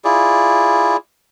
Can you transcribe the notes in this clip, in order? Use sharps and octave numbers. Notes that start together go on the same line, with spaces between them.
E4 F4 G#4 D5